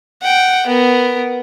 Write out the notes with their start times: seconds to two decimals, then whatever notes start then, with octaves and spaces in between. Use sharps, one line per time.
0.22 F#5 G5
0.67 B3 A#4